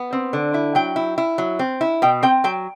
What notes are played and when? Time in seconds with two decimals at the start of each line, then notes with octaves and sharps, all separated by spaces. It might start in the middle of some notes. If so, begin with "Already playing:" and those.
Already playing: B3
0.13 C4
0.33 D3
0.54 E4
0.75 F#3 G5
0.96 E4
1.18 E4
1.38 F#3
1.59 C4
1.81 E4
2.02 B2 G5
2.23 C4 G5
2.44 F#3 G5